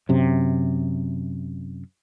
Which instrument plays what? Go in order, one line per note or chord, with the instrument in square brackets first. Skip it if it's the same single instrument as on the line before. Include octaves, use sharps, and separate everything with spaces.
[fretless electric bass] F#2 C3